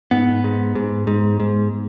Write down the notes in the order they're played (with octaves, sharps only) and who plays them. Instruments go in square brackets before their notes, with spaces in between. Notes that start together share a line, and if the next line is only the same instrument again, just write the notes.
[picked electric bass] G#2 B3
G#2
G#2
G#2
G#2